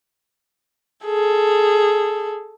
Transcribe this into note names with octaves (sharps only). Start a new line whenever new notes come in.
G#4 A4